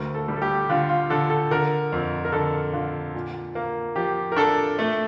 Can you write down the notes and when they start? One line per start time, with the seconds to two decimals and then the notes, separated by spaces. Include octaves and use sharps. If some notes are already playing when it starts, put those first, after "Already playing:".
Already playing: D2 A#4
0.14 A4
0.28 G3
0.37 A4
0.42 G4
0.69 D3 F4
0.89 F4
1.10 D3 A4
1.30 A4
1.51 D3 A#4
1.92 F2
2.25 A#4
2.32 D3 A4
2.73 D3 F4
3.15 A#2
3.55 A#3
3.96 F3 G4
4.32 A#4
4.36 D4 A4
4.79 A3